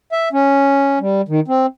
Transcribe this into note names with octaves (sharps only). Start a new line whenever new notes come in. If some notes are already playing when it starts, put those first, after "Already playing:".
E5
C#4
G3
D#3
C4